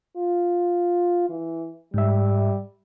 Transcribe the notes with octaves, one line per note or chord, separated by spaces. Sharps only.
F4
E3
G#2 G3 E5